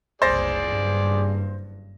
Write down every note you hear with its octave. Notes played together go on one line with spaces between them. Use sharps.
F#1 C2 G#4 C5 D5 A6 A#6
F#1 G2